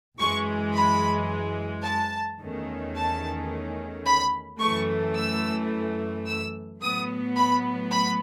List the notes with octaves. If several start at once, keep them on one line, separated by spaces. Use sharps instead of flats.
F#2 E3 G#3 C#6
B5
A5
E2 D#3 A3 C#4
A5
B5
F#2 E3 A3 C#6
E6
E6
A2 F#3 B3 D#6
B5
B5